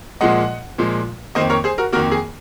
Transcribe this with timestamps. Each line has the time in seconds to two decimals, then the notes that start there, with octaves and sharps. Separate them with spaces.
0.21 A#2 F3 G#3 D#5 F#5
0.78 A#2 F3 G#3
1.35 F2 D#3 A#3 C5 D#5
1.50 A#4 C#5
1.64 G#4 C5
1.78 F#4 A#4
1.93 F2 D#3 A#3 F#4 A#4
2.11 G#4